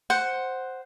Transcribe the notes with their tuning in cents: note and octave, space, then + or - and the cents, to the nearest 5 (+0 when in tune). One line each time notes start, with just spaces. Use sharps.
C5 +0 F#5 +0